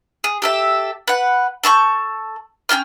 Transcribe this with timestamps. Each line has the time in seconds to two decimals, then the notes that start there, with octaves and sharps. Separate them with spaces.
0.24 G#4
0.42 G4 A4 E5
1.07 B4 F#5
1.63 A4 A5 C#6 G6
2.69 C#4 G#4 G5 F6